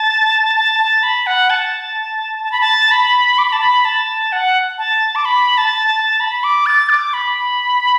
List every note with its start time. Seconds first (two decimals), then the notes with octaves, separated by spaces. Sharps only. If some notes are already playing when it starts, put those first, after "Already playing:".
Already playing: A5
0.56 A5
0.79 A5
1.03 B5
1.26 F#5
1.50 A5
2.44 A5
2.52 B5
2.61 A5
2.91 B5
3.38 D6
3.45 B5
3.53 A5
3.60 B5
3.85 A5
4.32 F#5
4.78 A5
5.15 D6
5.25 B5
5.58 A5
5.88 A5
6.20 B5
6.44 D6
6.66 A6
6.89 D6
7.13 B5